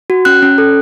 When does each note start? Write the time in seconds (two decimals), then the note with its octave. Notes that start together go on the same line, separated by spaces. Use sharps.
0.10 F#4
0.25 C#4 F#6
0.42 C#4
0.58 A4